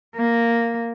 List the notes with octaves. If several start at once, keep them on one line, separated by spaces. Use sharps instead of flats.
A#3